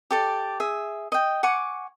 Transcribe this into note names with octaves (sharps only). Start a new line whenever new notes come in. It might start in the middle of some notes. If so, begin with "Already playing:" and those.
G4 A4 D5
G#4 E5
D#5 G5
F#5 G#5 C#6 D6